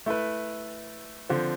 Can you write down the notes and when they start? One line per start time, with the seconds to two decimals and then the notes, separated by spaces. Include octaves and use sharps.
0.06 A3 E4 B4
1.29 D3 F3 C4